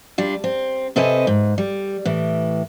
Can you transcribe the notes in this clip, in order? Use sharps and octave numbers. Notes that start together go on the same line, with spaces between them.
G3 D4 F4
C4
C3 C4 A4 B4 D#5 G#5
G#2
G3
A2 E3